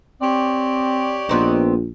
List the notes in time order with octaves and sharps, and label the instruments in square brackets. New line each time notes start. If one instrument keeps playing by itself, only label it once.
[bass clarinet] C4 [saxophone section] G4 C#5 D5
[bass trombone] A#1 [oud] B3 C4 D#4